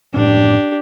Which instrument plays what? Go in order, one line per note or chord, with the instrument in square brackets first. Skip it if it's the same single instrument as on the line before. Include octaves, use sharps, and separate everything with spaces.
[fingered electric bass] F#1 A2 C#4 [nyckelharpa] D4 G4